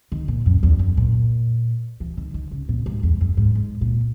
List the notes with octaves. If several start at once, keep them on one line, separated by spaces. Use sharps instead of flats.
D#3
A#2
F#2
E2
F#2
A#2
E3
D#3
D#3
C#3
A#2
G#2
E2
F#2
G#2
G#2
A#2